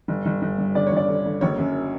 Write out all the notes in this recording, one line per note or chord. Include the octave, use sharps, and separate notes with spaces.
G1
G1
G1
G2
D3 D5
C#5
G1 D5
D3
D3
F#1 C#5
F#2